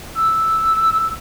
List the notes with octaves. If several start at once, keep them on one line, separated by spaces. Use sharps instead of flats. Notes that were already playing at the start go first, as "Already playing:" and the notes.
E6